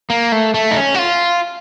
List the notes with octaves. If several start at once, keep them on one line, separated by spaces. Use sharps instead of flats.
A#3
A3
A3
D#4
C#4
F#4
F4